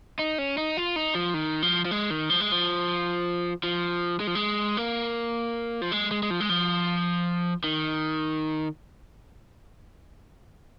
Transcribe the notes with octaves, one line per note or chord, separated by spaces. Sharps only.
D#4
C#4
D#4
F4
D#4
F3
D#3
F3
F3
G#3
D#3
F3
G#3
F3
F3
G#3
F3
G#3
A#3
F3
G#3
G#3
G#3
F3
G#3
F3
D#3